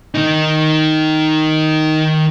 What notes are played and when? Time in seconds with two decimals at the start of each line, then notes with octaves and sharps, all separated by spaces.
0.15 D#3 D#4